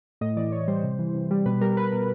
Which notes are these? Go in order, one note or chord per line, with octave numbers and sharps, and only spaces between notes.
A2 D#5
E3 D5
A2 C#5
G3 C5
C3
E3
C3
G3
B2 B4
G3 A#4
G3 B4
B2 A#4